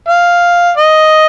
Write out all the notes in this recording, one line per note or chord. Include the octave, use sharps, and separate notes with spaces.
F5
D#5